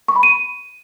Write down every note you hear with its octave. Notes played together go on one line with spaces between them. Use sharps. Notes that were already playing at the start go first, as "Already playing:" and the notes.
C#6
B5
D#7